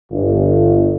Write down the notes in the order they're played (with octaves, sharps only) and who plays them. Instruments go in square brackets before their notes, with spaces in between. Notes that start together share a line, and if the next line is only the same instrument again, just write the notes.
[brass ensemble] G1